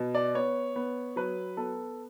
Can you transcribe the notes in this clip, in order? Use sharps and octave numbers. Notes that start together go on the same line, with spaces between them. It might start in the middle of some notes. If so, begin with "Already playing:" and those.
Already playing: B2
D5
B3 C#5
B3
F#3 B4
B3 A4